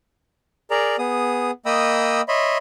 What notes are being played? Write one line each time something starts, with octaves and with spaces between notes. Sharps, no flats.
G#4 A#4 D5 A#5
B3 G#4 D#6
A#3 D#5 G5 B5 D#6 E6
C#5 D#5 E5 B5 C6